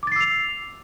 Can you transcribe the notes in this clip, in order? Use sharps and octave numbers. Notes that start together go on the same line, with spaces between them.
D6 E6 A6 C7 F7